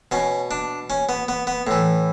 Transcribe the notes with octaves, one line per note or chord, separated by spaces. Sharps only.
B2 C#4
D4
C#4
B3
B3
B3
A2 E3